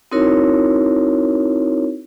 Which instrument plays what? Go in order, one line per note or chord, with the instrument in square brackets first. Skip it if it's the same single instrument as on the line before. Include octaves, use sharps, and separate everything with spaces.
[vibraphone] C4 D#4 E4 F#4 A#4 C#5